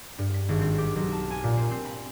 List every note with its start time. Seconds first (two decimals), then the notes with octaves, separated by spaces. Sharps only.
0.18 G2
0.34 B6
0.49 G#1
0.61 C4
0.78 G4
0.95 B1
1.12 A5
1.31 G#5
1.44 A#2
1.57 C4
1.71 C4
1.85 B5